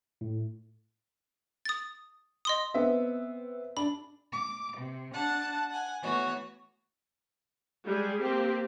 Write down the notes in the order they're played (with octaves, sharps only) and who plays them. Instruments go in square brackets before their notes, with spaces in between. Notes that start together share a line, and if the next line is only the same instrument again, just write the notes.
[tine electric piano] A2
[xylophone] D#6 A6
D#5 C6 D#6
[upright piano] B3 C4 E5
[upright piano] D4 [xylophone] B5
[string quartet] D6
C3
D4 F#5 A5 A6
F#5 G#5
E3 A3 B3 F#4 C#5
[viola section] G3 G#3 G#4
A#3 C4 G4